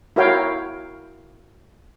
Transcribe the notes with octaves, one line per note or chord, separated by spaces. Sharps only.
E4 F#4 A#4 C#5 F5 G5